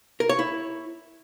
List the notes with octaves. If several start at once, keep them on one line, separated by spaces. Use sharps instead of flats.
A#4
C#5
E4